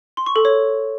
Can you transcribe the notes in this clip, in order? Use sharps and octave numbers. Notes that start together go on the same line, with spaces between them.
C6
C#6
A4
C#5